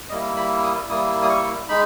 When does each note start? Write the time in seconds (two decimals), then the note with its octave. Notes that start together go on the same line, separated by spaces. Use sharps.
0.10 G3 A#3 E4 D#5
0.36 B5
0.63 D#6
0.89 G3 A#3 E4 D#6
1.23 D#6
1.29 C#6
1.69 G#3 D#4 B5